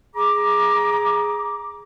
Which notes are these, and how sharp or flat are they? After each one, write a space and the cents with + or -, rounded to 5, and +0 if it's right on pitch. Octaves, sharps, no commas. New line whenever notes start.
G#4 +0 A#5 +20 D6 +10